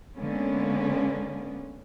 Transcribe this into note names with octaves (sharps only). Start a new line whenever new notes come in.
D3 G#3 A#3 B3 C#4